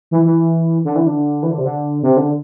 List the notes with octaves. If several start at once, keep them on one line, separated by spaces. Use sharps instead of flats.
E3
E3
D3
E3
D3
E3
D3
C3
D3
C3
D3